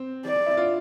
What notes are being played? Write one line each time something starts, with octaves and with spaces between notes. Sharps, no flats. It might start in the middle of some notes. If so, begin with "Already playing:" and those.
Already playing: C4
D5
E4
D4 F4